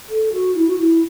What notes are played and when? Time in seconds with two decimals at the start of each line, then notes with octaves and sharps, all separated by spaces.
0.09 A4
0.33 F#4
0.55 E4
0.67 F#4
0.78 E4